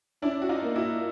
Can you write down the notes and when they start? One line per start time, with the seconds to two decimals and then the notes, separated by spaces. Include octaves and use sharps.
0.22 C#4 D4 E4
0.42 F#4
0.49 D#4 F4
0.63 A#3
0.76 E4 F#4